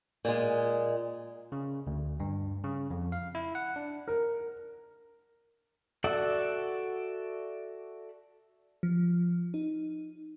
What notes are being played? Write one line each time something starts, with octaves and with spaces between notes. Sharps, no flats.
A#2 G#3
C#3
D2
G2
C#3
F2
F5
E4
F#5
D4
A#4
F#4 A4 D5 E5 F#5
F3
D#4